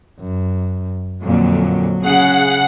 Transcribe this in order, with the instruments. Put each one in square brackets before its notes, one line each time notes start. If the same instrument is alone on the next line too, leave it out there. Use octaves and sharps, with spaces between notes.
[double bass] F#2
[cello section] F2 A#2 D3 [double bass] F#3
[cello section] C#3 G#4 [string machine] F#5